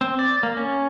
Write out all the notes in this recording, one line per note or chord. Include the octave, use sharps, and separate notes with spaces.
C4
D5
A#3
C#4